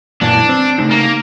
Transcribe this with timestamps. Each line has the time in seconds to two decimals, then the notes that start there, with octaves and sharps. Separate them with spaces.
0.21 F#2 A#2 E3 D4
0.49 C4
0.78 C#3 A3 D#4
0.91 A#3